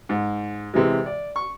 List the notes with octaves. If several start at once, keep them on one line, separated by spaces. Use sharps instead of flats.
G#2
C3 E3 G#3
D5
C#6